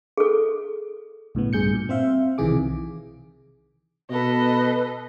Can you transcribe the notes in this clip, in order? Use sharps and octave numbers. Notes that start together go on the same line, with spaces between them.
G#4 A4
B1 A2 C#3 B3
G2 G#4 G6 C#7
A#2
C4 C5 E5 F5
B1 C3 D#3 E3 G#4 D6
B2 A4 B4 D#5